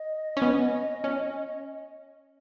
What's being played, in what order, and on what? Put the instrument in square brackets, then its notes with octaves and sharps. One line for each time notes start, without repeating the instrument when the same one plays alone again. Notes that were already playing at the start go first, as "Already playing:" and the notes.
Already playing: [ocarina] D#5
[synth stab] C#4
B3
C#4